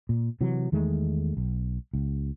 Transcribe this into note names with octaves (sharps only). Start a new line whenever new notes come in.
A#2
C3 E3 F#3
E2 D#3 G#3 A3
B1
C#2